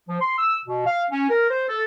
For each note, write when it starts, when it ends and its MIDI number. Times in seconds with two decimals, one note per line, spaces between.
0.09 0.18 53
0.21 0.38 84
0.38 0.58 88
0.66 0.84 47
0.86 1.03 77
1.11 1.26 61
1.30 1.47 70
1.50 1.64 72
1.69 1.84 69